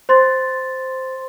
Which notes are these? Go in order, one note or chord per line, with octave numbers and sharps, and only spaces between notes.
C5 C6 A6